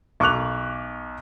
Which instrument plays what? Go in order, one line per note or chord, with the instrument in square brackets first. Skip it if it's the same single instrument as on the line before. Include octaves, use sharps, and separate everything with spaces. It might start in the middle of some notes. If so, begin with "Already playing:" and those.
[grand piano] B1 C#6 D6 F#6 F7